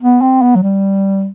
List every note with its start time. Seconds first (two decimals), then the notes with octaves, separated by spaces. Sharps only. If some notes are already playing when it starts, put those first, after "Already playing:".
0.01 B3
0.21 C4
0.42 B3
0.55 F#3
0.63 G3